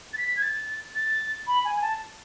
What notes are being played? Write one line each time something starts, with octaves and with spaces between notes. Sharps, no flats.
A6
B6
G#6
A6
A6
B5
G#5
A5